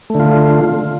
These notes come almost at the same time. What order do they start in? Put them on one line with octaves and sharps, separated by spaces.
A3 D3 F4